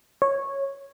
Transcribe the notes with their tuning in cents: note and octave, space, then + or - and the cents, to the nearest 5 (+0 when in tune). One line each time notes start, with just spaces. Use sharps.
C#5 -10